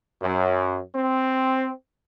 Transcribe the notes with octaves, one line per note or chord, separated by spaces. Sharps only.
F#2
C4